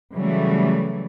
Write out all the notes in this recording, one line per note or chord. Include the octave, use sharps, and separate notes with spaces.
C#3 E3 F#3 G3 A3